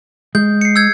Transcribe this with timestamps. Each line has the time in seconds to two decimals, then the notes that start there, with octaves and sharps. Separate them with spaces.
0.35 G#3 G6
0.61 C7 C#7
0.76 E6 G6 G#6